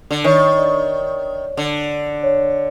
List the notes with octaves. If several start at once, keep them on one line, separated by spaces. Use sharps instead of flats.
D3
D#3 C#5
D5
D3
C#5